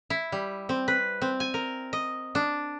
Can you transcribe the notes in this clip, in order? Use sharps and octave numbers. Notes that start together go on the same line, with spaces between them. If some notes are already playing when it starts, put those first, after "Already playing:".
E4
G3
C4
B4
C4
G#5
A#4
D#5
D4